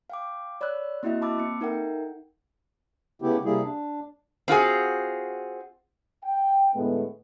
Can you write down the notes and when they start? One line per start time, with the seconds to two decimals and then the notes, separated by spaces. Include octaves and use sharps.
0.10 F5 G5 D6
0.61 C#5 D5 B5 E6 F#6
1.03 A#3 C4 E4 F#4 D#5 E5
1.21 A5 B5 D6 E6 A6
1.38 A#3 C4 C#7
1.61 D#4 A4 A#4 E5 F#5 G5
3.22 C#3 A3 B3 E4 G4
3.45 C3 G3 A#3 E4 G#4
3.62 D4
4.48 C4 F4 F#4 G#4
6.24 G5
6.75 A2 D3 G#3 A3 B3